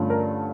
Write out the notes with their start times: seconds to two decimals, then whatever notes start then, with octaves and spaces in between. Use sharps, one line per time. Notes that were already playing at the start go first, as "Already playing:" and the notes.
Already playing: G2 D3 A3 C#4 F4
0.10 A#4